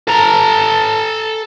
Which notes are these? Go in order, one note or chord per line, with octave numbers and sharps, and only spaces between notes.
A4 A#5